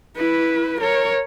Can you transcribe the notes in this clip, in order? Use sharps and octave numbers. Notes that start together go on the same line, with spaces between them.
E4 B4
A#4 C#5